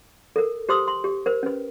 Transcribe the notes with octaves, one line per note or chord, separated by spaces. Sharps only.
A4 A#4
G4 C5 C6 D#6 E6
C6
G4
A#4 C5
C#4 B4